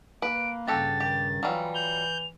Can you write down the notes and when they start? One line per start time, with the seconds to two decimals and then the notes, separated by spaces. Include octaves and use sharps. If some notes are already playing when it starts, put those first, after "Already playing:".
0.22 A#3 B4 D7
0.67 G2 C#3 F#4 G4 A4 A6
1.00 D#3 G4
1.43 E3 F#3 G3 F4
1.75 G6 F7